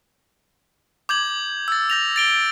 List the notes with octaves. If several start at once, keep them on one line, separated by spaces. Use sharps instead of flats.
D6 G6 G#6 F#7
E6 A6
G6 A#6 F7
A6 D7 G7